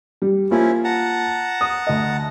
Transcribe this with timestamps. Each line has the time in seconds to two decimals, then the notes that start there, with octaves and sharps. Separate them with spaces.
0.22 G3
0.51 F3 A#3 C#4 E4 F4
0.84 F#5 A5 A#5
1.61 D#6
1.87 D2 D#5